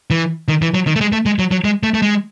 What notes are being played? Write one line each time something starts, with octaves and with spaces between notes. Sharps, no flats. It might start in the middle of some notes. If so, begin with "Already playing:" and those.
E3
D#3
E3
F#3
D#3
A3
G#3
A3
G#3
F#3
F#3
G#3
A3
A3
G#3